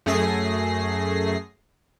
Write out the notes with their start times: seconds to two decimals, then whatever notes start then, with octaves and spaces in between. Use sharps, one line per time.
0.06 F#2 A3 G#4 A#6 C7